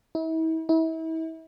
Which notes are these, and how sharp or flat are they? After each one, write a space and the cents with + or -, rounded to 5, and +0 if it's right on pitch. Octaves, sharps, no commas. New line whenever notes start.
E4 -40
E4 -35